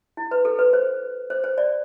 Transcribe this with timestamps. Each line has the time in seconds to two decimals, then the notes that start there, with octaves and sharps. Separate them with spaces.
0.17 E4
0.31 B4
0.45 A4
0.59 B4
0.73 C5
1.30 C5
1.44 C5
1.58 D5